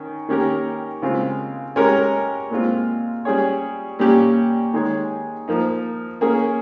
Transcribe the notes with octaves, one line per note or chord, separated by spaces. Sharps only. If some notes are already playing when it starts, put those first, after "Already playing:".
Already playing: D#3 C#4
D#3 A#3 C#4 G4 A#4
C#3 G#3 C4 F4
G#3 C#4 G4 A#4 C#5
A#2 G#3 C4 F4
G3 C#4 G#4 C#5
A#2 G3 C#4 G4
D#3 G#3 D#4 G#4 C#5
F3 A#3 D#4
A#3 C#4 G#4